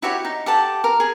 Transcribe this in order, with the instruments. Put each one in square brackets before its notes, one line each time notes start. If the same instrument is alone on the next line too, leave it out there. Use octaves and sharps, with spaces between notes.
[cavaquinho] E4 F#4 G4 C#5
D#4
G4 A4 F#5 A5
A#4
G#4